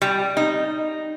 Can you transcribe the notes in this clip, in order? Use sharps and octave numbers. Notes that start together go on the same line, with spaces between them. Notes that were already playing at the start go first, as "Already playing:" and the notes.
G3
D#4